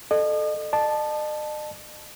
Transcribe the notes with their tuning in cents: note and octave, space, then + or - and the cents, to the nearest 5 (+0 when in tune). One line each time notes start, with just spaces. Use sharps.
A4 -10 D#5 -40
D#5 -45 A5 -5